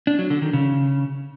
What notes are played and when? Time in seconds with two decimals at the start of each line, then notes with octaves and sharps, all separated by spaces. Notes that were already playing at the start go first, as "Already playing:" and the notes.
0.07 D4
0.19 F#3
0.30 D3
0.42 D#3
0.53 C#3